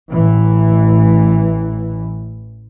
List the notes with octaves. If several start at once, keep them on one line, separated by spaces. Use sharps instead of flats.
A1 E3